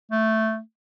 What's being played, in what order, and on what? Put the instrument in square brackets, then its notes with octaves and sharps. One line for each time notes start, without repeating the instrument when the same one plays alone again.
[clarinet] A3